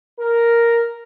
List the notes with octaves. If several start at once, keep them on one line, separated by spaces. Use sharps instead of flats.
A#4